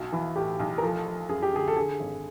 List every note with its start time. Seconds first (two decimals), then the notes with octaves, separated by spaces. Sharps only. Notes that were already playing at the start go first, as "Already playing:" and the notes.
Already playing: B1 F#4
0.12 E3
0.36 A2 G4
0.60 B1
0.78 A#4
0.83 F3 A4
1.06 F3
1.29 F#2 G#4
1.43 G4
1.52 D3 G#4
1.68 A4
1.76 D3 G#4
2.00 G#1